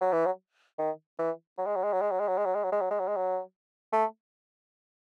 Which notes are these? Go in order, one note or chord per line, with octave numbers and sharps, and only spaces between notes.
F#3
E3
F#3
D#3
E3
F#3
G#3
F#3
G#3
F#3
G#3
F#3
G#3
F#3
G#3
F#3
G#3
F#3
G#3
F#3
G#3
F#3
G#3
F#3
A3